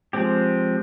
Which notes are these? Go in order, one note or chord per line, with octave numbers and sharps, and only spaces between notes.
F3 G#3 C4 G4